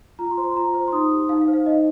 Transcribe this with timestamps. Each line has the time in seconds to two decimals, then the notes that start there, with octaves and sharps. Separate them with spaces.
0.19 F4 A#5
0.31 C6
0.38 C5
0.44 C6
0.56 F4 A#5
0.74 C5
0.88 C6
0.92 D#4 D#6
1.12 G4
1.29 D#4 F5
1.41 F5
1.48 C5
1.54 F5
1.66 D#4 D#5